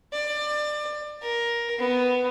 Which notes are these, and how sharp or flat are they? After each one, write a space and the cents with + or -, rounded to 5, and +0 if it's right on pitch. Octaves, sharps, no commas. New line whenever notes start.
D5 +25
A#4 +15
B3 +15